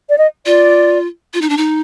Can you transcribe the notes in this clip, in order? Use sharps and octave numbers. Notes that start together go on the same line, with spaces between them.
D5
D#5
F4 D5
F4
D#4
D4
D#4